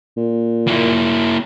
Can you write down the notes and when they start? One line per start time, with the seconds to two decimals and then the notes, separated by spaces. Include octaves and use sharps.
0.16 A#2
0.68 A#3 E4